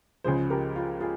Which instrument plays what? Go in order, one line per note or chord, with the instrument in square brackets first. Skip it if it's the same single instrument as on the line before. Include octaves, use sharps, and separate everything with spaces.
[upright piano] C#2 C#3 F3 G#4 C5
G4 A#4
F4
F4 G#4